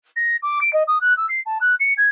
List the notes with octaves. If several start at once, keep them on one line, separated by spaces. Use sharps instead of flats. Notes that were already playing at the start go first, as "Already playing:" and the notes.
A#6
D6
D7
D#5
D#6
F#6
E6
C7
A5
F#6
C#7
G#6